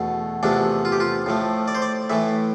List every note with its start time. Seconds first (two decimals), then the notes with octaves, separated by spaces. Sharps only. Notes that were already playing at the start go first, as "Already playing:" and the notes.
Already playing: E2 B2 A3
0.43 E2 C3 F3 A3 D4
0.85 F4
0.92 G4
1.00 F4
1.26 A2 F3 A3
1.68 D5
1.75 C5
1.82 D5
2.10 A2 E3 A3 E5